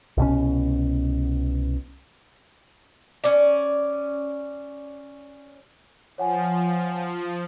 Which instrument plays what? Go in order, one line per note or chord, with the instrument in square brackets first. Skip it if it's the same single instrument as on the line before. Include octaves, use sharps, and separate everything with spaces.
[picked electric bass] C2 B2 C#4
[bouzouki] C#4 D5
[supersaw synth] F3 [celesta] C#5 F#5 G#5